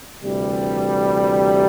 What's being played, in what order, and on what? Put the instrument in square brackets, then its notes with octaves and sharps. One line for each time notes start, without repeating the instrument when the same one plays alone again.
[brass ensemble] D2 C3 E3 G3